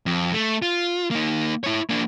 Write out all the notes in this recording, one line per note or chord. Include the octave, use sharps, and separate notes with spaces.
F2
A3
F4
A#3 D#4
E4 C#5
A#3 D4